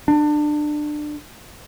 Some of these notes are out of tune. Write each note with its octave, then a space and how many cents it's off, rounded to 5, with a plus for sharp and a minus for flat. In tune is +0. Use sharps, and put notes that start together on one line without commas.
D4 +25